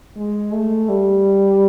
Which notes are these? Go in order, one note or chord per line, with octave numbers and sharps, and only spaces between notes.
G#3
A3
G3